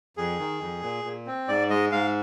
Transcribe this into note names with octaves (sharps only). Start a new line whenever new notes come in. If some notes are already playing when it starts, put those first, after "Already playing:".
F2 G#4
D#3
F2
A#2
A#2
C4
G#2 D5
G#3 D#5
G#2 F5